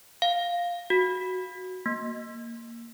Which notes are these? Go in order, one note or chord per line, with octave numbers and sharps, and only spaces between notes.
F5
F#4
A#3